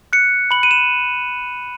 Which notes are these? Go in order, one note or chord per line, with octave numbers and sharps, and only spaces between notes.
F#6 C#7
B5 F#7
D#7
E7